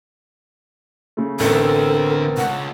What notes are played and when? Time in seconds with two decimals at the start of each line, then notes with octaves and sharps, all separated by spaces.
1.17 C#3 A3
1.40 A1 D3 A3 B3 C4 A4 A#4
2.37 C#2 C#3 F#5